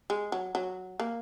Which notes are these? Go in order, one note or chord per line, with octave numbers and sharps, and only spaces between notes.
G#3
F#3
F#3
A#3